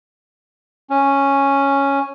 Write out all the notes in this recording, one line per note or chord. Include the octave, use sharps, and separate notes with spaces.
C#4